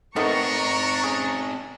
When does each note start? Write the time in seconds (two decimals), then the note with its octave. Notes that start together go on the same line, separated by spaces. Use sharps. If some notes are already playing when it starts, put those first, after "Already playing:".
0.16 D#3 A3 B3 C4 D4 D#4 A#5 C#6
1.04 C#4 G#4